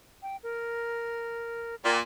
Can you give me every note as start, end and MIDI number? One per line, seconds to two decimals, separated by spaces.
0.23 0.37 79
0.43 1.75 70
1.84 2.00 46
1.84 1.96 79